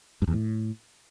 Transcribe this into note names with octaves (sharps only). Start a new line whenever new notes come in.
G2
E2
A2